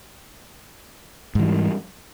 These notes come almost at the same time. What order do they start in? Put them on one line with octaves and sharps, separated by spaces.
G#2 E3 G3